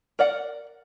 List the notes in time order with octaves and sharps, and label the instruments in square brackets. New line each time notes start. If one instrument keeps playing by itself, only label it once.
[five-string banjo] A#4 D5 F#5